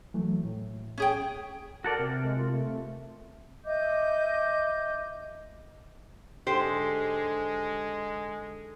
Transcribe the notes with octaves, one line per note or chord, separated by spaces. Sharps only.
E3 F#3 A3
A2
C#4 G#4 G5
F#4 A4 A#4 D5
C3
G#3
F4
A3
D#5 E5 D6 G6
G#2 D3 G#3 G4 C5